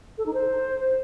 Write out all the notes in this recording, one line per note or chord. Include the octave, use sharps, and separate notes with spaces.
A4
D#4
C5